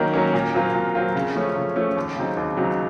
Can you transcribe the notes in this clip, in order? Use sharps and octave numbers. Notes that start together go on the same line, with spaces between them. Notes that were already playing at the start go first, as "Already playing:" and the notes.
Already playing: D#3 F#3 A#3 C#4
F#3 A#3 C#4
A#2
F#3 C4 F4 A#4
A#2
F#3 C4 F4 A#4
C#3
F3 A3 C#4
C#3
F3 A3 C#4
D#2
C#3 F#3 C4 D#4
D#2
C#3 F#3 C4 D#4